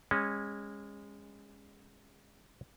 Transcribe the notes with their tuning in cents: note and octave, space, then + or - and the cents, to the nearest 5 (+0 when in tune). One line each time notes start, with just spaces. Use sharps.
G#3 -25 C#4 -10